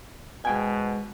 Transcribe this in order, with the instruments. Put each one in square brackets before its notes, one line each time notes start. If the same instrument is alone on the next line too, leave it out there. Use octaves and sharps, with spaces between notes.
[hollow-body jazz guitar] G#2 G5 G#5 [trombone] B2